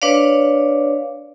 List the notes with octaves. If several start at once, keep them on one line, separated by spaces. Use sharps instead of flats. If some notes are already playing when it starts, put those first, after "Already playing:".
D4 B4 C#5 D5 F5